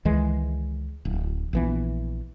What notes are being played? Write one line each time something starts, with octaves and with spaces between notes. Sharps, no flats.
C#2 D#3 E3 G#3
D1
A#1 E3 B3